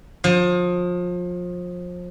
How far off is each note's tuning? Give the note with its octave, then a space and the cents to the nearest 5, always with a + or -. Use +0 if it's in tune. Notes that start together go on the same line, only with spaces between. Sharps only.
F3 +30